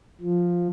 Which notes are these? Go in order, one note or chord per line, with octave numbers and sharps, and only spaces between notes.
F3